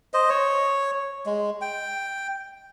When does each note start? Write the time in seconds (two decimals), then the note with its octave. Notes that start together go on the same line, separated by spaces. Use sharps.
0.14 C5 D#5
0.30 C#5
1.26 G#3
1.61 G5